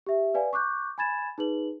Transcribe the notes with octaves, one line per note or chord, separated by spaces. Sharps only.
G4 E5
B4 D5 F5 G#5
C#6 D6 F#6 G6
G#5 B5 G#6 A6 E7
D#4 G#4 B4 F#7